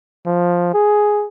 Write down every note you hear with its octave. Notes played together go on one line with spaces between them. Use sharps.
F3
G#4